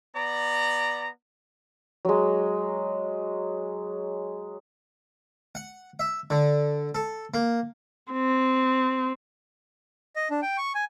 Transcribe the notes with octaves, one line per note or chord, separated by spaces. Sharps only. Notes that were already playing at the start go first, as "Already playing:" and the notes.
B3 D5 A#5
F#3 G#3
F#5
E5
D3
A4
A#3
C4
D#5
D4
G5
C#6
G#5